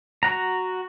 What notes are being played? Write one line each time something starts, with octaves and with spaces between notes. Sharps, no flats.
F#4 F#5 A#5